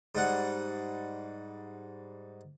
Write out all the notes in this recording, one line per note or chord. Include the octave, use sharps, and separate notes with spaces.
G#2 G3 F#5